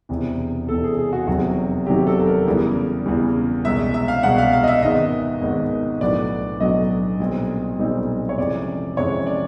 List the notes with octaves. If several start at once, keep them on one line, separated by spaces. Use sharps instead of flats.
E1 E2 C3 E3
E1 E2 C3 E3 A4
G#4
G#4
F#4
F1 E2 C3 D#3 F#3 F#4
F1 E2 C3 D#3 F#3 G4
A4
A4
A#4
E2 C#3 E3 G3
E2 C#3 E3 G3
C2 B2 G#3 E5
E5
F5
C2 B2 G#3 F#5
F5
F5
D#5
E5
G#1 G#2 D#3 G#3 B3 D#5
G#1 G#2 D#3 G#3 B3
B1 A2 F#3 B3 D4 D5
B1 A2 F#3 B3 D4 D#5
B1 A#2 G3 C4 D#4
B1 A#2 G3 C4 D#4
C#5
F2 C3 E3 G#3 C#4 D5
F2 C3 E3 G#3 C#4 C#5
D5